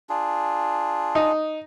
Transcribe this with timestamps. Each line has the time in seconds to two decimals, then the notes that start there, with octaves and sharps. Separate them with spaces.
0.09 D4 F4 G#4
1.15 D#4